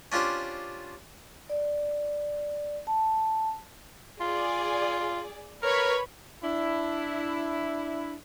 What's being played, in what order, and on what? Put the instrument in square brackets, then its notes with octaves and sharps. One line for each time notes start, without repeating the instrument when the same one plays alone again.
[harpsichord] C#4 D4 F4 G4 C5
[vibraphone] D5
A5
[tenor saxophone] F4 [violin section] G#4 D5
[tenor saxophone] A#4 [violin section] B4 C#5 B5
[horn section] D4 E4